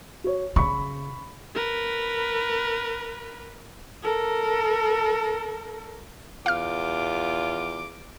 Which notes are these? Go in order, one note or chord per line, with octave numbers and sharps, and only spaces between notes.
F#4 C#5
C#3 B5 C#6
A#4 B4
A4 A#4
E2 F4 F5 D6 F6